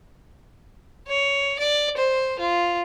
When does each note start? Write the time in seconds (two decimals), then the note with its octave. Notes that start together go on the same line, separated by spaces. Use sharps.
1.07 C#5
1.59 D5
1.97 C5
2.39 F4